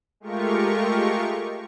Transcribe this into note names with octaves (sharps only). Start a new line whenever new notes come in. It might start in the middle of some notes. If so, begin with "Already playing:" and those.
G#3 A3 F4 G4 A#4 C#6